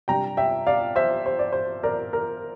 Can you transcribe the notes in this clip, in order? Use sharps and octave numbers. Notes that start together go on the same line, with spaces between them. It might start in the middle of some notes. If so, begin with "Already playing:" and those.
C3 G3 D4 G5 A#5
E5 G5
D5 F5
C5 E5
C5
D5
C5
A#4 D5
A#4